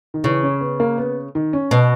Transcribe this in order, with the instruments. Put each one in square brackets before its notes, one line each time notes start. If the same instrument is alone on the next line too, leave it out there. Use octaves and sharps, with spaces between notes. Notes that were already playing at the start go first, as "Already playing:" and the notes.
[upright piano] D#3
[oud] C#3 [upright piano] E3
[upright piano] C#4
B3
A#3
B3
D#3
C#4
[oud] B2 [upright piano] B3